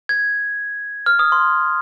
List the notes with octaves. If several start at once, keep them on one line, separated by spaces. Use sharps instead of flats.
G#6
F6
D#6
C6